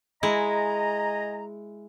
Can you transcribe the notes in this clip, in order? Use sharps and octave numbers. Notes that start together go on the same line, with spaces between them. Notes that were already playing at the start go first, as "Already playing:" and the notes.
G#3 E4 D#5 G#5 A#5